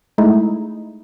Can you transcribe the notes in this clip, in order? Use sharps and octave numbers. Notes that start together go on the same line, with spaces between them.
G#3 A3 D#4 E4